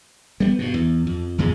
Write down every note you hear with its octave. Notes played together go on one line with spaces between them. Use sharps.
G3 A3 B3
G2 B2
E2
F2
G1 E2 A#2 G#3